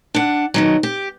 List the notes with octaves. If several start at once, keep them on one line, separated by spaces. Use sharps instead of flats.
D4 F#5
B2 D#3 F#3
G4